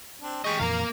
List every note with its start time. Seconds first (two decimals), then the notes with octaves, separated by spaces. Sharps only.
0.22 C4 D4
0.44 G#3 G4 D#5 C#6
0.59 F2 A#2 E3 A#3 A#4 F5